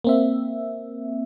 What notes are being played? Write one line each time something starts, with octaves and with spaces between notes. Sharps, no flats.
A#3 C4 E5